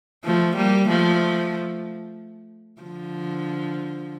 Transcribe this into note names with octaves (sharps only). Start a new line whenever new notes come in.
F3 A3
G3 A#3
F3 A3
D3 F3